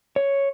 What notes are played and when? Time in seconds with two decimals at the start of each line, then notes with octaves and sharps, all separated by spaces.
0.16 C#5